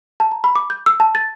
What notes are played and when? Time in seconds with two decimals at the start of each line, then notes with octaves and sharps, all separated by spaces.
0.20 A5
0.32 A#5
0.44 B5
0.56 D6
0.70 G6
0.86 E6
1.00 A5
1.15 A6